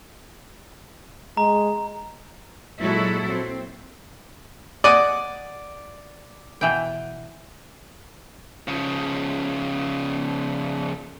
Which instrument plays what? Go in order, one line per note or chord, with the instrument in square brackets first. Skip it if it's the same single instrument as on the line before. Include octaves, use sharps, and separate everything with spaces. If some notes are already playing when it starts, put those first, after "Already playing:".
[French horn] G#3 [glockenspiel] A#5
[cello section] A#2 F#3 G#3 E4 F#4 A4
C4
[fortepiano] D5 [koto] D#5 F#5 G#5
[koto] B2 E3 G5
[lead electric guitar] C#3 F3